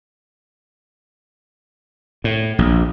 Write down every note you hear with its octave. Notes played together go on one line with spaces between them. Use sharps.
A2
A#1